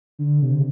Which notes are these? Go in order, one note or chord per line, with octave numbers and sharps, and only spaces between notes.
D3
C3